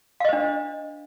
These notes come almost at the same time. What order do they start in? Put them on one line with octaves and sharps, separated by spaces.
F5 D#5 C5 D4